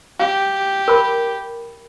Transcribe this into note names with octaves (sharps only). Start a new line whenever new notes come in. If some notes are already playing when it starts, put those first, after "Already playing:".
G4 F5
A#4 B5